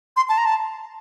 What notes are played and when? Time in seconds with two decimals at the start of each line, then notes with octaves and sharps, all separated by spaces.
0.16 C6
0.29 A5
0.38 A#5
0.45 A5